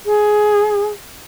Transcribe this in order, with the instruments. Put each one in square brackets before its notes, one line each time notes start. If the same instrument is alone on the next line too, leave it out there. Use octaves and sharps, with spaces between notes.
[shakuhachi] G#4